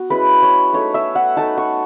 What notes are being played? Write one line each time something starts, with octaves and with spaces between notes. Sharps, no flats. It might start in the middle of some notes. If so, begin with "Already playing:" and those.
Already playing: B3 F#4
G#3 C#4 E4 B4
C#5
A3 D#4 C#5
E5
F#5
A3 D#4 A5
C#6